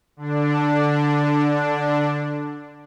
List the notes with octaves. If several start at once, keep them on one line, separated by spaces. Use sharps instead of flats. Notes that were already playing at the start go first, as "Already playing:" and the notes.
D3 D4